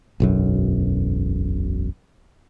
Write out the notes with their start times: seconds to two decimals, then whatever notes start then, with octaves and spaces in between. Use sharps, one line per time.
0.20 E1 B1 F#2